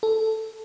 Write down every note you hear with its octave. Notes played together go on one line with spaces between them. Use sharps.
A4